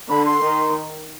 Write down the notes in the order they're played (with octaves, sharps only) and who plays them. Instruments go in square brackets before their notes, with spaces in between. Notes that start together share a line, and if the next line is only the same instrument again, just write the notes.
[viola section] D3 [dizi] B5
[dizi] C6
[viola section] D#3